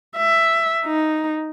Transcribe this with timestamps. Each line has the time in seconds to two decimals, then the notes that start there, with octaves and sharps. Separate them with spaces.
0.17 E5
0.85 D#4